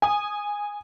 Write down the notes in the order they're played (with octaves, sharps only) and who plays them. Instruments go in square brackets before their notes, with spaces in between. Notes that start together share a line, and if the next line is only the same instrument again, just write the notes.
[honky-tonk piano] G#5 D#6